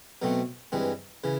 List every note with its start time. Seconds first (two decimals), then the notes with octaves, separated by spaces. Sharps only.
0.22 B2 F#3 A3 C4
0.72 G2 E3 G#3 C4
1.24 C#3 E3